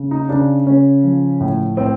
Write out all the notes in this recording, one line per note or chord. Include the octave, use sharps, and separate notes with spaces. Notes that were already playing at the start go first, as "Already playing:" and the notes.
Already playing: C#3
D#4
C#3 D4
C#3 C#4
F3
A2
A2 C4